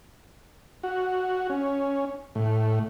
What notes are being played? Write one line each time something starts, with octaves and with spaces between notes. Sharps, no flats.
F#4
C#4
A2